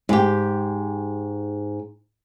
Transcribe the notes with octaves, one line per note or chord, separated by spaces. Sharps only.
G#2 G4